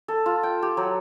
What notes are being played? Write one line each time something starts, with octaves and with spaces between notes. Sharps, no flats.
A4
F4
G5
G4
F#3